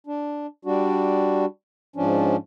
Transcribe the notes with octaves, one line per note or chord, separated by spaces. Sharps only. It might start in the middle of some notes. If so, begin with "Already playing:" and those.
D4
G3 D4 F#4
G#2 F3 C#4 D4